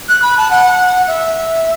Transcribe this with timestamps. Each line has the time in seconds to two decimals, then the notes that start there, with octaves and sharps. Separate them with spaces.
0.09 F#6
0.22 B5
0.37 A5
0.51 F#5
1.08 E5